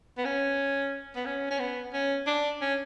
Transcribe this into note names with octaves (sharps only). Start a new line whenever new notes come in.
B3
C#4
B3
C#4
C#4
B3
C#4
D4
C#4